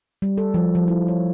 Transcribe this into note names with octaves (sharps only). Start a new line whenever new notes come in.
G3
A4
F3
F3
E4
C#5